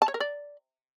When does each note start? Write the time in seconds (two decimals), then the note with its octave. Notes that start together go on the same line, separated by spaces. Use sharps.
0.02 A5
0.08 C#5
0.14 A#4
0.20 D5